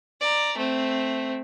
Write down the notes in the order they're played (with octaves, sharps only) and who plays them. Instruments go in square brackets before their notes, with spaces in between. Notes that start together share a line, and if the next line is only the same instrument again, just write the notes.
[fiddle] D5 A#5
A3 C4